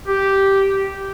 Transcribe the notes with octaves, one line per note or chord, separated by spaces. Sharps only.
G4